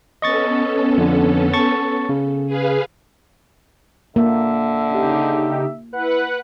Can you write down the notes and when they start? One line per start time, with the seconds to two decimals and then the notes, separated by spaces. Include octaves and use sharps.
0.22 B3 C#4 A4 D#5 C#6 A6
0.98 F2 D3
1.53 A5 C#6 A6
2.09 C#3
2.47 G#4 B4 F5
4.16 D3 A#3 E5
4.90 C#3 D#4 G4
5.93 E4 B4 F#5 F#6